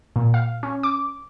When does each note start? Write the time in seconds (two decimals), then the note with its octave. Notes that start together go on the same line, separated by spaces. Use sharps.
0.16 A#2
0.34 F5
0.63 C#4
0.83 D6